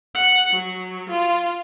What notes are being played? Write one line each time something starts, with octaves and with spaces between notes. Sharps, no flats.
F#5
F#3
F4